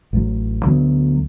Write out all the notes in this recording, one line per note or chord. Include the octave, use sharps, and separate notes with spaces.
A1 A2 F#3
D2 D3 F#3 B3